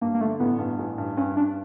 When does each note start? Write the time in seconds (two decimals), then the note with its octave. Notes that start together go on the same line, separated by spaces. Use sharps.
0.01 G2 A#3
0.14 A#3
0.21 D3 A3
0.40 A1 B3
0.58 G2
0.79 A1
0.98 G2
1.17 G2 C#4
1.36 G2 D4